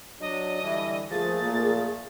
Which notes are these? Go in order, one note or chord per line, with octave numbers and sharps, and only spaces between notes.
F#3 D4 D#5
D3 E3 G3 E5
A#1 F3 A3 G#4 A#4 A6
A#2